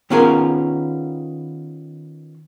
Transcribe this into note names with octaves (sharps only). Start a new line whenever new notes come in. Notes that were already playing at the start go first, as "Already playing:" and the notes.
D#3 B3 C#4 F4 G#4 A#4